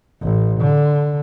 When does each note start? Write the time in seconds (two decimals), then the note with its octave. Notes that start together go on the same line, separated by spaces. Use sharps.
0.22 A1
0.61 D3